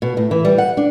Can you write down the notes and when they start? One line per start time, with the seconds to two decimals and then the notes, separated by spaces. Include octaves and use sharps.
0.02 B2
0.17 A2
0.31 E3
0.45 G3
0.58 F#5
0.77 D4